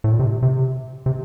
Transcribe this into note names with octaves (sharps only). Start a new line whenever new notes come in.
A2
A#2
C3
C3
C3